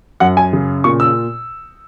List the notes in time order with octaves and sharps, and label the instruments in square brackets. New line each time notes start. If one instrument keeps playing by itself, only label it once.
[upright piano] F#2 F#5
G#5
C#3
A#2 C#6
E6